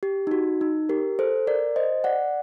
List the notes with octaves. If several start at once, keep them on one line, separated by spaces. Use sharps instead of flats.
G4
D#4
F#4
D#4
G4 A#4
A4 C5
A#4 D5
C5 D#5
D5 F#5